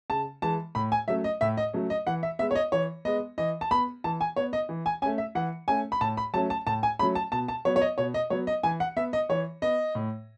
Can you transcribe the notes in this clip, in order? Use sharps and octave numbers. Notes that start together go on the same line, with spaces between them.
C#3 A5
E3 G#3 A5
A2 B5
G#5
F#3 A3 C#4 E5
D#5
A2 E5
D#5
F#3 A3 C#4
D#5
E3 F#5
E5
G#3 B3 E5
C#5
D#5
E3 C#5
G#3 B3 D#5
E3 D#5
A5
B3 B5
E3 A5
G#5
B3 C#5
D#5
E3
G#5
A3 C#4 G#5
E5
E3 F#5
A3 C#4 G#5
B5
A2 A5
B5
F#3 A3 C#4 A5
A5
A2 A5
G#5
F#3 A3 C#4 B5
A5
B2 A5
A5
F#3 B3 C#5
C#5
D#5
B2 C#5
D#5
F#3 B3 C#5
D#5
E3 G#5
F#5
B3 E5
D#5
E3 C#5
B3 D#5
A2